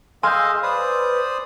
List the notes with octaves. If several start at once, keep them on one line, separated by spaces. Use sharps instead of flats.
G#4 D#5 F5 G#5 C6 E6 F6 G6
B4 C5 D5 D#6